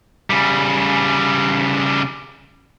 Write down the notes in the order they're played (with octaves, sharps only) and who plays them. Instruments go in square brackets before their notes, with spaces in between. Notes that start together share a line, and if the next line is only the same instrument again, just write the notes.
[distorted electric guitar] C#3 G3